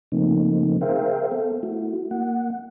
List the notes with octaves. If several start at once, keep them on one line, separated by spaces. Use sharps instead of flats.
C#3 F3 A3 A#3 C4 D#4
G#4 A#4 C5 E5 F5 G5
B3 A4
A3 E4 F#4
A#3 F#5